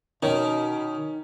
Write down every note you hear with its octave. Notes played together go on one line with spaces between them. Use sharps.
B2 D#3 C#4 D#4